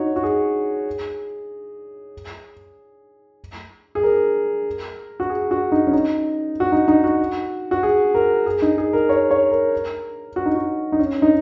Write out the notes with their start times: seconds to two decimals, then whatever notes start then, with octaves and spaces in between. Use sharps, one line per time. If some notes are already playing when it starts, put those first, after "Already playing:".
Already playing: D#4 F#4 C#5
0.16 F#4
0.23 G#4
3.95 G#4
4.03 A#4
5.20 F#4
5.30 G#4
5.51 F#4
5.72 D#4
5.87 C#4
5.93 D#4
6.60 F#4
6.72 D#4
6.88 D#4
7.04 F#4
7.71 F#4
7.83 G#4
8.15 A#4
8.46 G#4
8.62 D#4
8.78 G#4
8.93 A#4
9.09 C#5
9.31 C#5
9.51 A#4
10.36 F#4
10.46 D#4
10.55 F#4
10.92 D#4
10.99 C#4
11.22 D#4